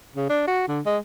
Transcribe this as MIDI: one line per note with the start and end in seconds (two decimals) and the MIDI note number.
0.16 0.29 49
0.30 0.43 62
0.47 0.64 66
0.68 0.80 50
0.85 0.98 56